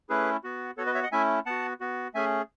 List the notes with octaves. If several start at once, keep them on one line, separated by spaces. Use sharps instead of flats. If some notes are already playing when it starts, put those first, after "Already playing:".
A3 C#4 E4 G#4 B4
B3 F#4
B3 F#4 A4 C#5
B4 D#5
C#5 E5
D#5 F#5
A3 C#4 E4 E5 G#5
B3 F#4 F#5 A5
B3 F#4
A3 C#4 G#4 E5 G#5